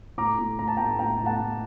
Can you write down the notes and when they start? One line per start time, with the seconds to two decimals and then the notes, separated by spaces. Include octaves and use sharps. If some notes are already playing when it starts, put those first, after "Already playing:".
0.18 A2 A#5 D6
0.38 A2
0.59 A2 A#5
0.68 A5
0.77 A2 G5 A#5
0.99 A2 G5 A#5
1.20 A2
1.26 F#5 A5
1.40 A2